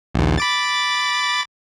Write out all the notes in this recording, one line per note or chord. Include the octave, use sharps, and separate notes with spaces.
A#1 D#2
B5 D6 A6